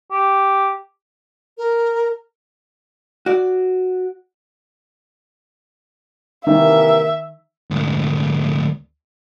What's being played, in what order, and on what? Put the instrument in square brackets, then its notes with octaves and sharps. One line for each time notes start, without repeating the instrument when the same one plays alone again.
[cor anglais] G4
[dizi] A#4
[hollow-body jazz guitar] F#4 D5
[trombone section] C3 E3 A#3 [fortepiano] D#3 [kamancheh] E5
[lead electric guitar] D2 G#2